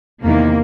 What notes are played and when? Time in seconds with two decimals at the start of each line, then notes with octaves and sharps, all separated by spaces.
0.23 E2 C3 D#3 A#3